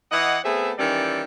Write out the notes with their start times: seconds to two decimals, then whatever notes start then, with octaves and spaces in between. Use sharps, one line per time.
0.12 E3 D#5 F#5
0.44 A3 B3 C4 G#4 E5
0.78 D#3 E3 G3 C#4 A4 D5